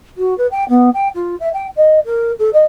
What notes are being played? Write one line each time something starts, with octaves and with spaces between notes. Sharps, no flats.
F#4
B4
G5
B3
G5
F4
E5
G5
D#5
A#4
A4
D#5